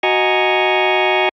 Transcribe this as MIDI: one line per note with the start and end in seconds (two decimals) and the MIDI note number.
0.03 1.29 66
0.03 1.29 75
0.03 1.29 80
0.03 1.29 82
0.03 1.29 85